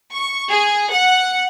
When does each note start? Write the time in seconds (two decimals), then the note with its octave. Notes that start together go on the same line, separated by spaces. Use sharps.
0.12 C#6
0.50 G#4
0.93 F#5